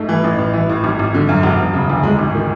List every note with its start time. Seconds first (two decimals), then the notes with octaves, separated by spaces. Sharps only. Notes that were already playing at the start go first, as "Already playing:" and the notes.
Already playing: G#2 A3
0.09 E3
0.24 A1
0.39 A1
0.53 E3
0.69 A2
0.84 G#1
0.99 G#1
1.14 D3
1.29 F#2
1.43 E1
1.59 E1
1.73 C#3
1.90 D2
2.03 G#3
2.18 G#1
2.35 D#3